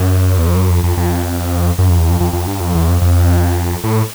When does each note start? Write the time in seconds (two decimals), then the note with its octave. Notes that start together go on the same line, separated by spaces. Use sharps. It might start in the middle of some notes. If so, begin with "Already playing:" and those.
Already playing: F#2
0.38 E2
0.47 F2
0.56 F#2
0.69 F2
0.83 F2
0.97 F2
1.78 F#2
1.89 F2
1.99 E2
2.10 F2
2.20 F2
2.33 F2
2.47 G2
2.60 F2
2.75 E2
2.89 F2
3.02 F2
3.84 A2